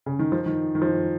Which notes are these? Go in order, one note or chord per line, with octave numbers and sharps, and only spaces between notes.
C#3
D#3
F3
D#3
D#3
F3
D#3